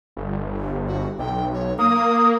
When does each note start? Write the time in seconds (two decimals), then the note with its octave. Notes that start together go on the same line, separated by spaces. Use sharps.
0.17 G1
0.88 F#4
1.19 B1 G5
1.53 C#5
1.79 A#3 D#6